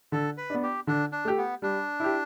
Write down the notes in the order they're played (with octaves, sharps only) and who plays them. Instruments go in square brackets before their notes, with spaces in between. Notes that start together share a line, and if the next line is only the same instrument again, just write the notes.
[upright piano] D3 [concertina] A4
[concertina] B4
[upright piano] B3 D4
[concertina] G4
[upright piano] D3 [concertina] D4
[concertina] D4
[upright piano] A3 G4
[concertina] B3
[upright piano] G3 [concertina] D4
[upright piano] E4 G4